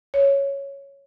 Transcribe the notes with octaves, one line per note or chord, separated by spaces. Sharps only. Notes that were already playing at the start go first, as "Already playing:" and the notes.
C#5